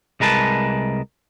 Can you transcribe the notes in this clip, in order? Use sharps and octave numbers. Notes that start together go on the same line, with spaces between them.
C2 G#3 A#4 B4 A5